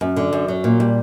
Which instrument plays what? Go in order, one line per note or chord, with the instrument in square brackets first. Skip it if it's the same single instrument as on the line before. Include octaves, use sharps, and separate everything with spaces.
[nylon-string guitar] F#2
D3
F#2
F#3
A#2
G3